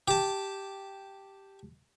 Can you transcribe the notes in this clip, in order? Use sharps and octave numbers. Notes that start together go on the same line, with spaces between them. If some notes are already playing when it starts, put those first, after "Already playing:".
G4 A5